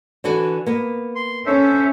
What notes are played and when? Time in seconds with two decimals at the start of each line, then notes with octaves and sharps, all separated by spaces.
0.24 D3 E3 F#4
0.66 A#3 B3
1.16 C6
1.46 C#4 A4 C5 E5